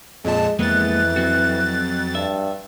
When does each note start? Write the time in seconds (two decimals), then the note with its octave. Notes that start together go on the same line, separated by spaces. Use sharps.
0.25 F2 A#2 G#3 A5
0.59 F2 E3 G#3 A#3 B3 F#6 A6
1.16 F#3 C4 F#4
2.15 G2 E5